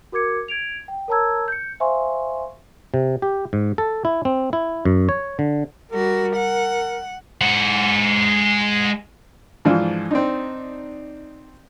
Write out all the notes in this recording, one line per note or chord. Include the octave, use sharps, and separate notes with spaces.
F#4 A#4 D6 G#6 C#7
G#6 D7 F7
G5
A#4 C#5 A5 A#5 E6 G#6
G6 C#7
C5 E5 F5 G#5 C6 C#6
C3
G4
G#2
A4
E4
C4
E4
F#2
C#5
D3
G3 F#4 A#4
F#5
G#3 F#5
G#2 E3 F3 D4 F4
C4 D4 D#4